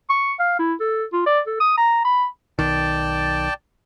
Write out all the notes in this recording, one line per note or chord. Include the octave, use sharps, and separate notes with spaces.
C#6
F5
E4
A4
F4
D5
A4
D#6
A#5
B5
B1 D#3 D5 G5 A5